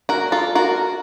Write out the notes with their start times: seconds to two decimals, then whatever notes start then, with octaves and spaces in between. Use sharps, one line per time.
0.09 F#4 A#4
0.32 F4 A4
0.55 F#4 A#4